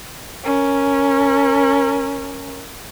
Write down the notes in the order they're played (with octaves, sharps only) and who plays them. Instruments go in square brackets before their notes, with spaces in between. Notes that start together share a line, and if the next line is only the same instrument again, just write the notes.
[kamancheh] C#4 A#4